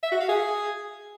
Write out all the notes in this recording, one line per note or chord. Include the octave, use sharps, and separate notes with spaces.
E5
F#4
F5
G#4